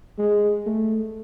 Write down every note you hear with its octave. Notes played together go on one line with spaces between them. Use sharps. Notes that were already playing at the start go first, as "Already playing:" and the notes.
G#3
A3